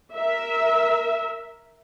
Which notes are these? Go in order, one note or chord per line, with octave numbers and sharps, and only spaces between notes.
A#4 E5